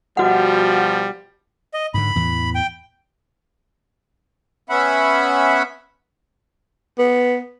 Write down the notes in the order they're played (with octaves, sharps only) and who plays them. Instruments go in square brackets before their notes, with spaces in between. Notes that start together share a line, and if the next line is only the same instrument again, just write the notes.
[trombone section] B2 F3 G3 [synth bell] F#4 F#5
[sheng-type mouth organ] D#5
[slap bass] G#2 D3 [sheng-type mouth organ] B5
[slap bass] E2 A2 E3
[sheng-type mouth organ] G5
[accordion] B3 C#4 E5 F#5 B5
[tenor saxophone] B3